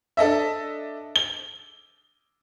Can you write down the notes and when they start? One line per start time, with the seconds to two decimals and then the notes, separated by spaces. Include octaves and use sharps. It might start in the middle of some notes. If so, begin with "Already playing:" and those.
0.17 D4 A4 D#5 E5
1.16 G7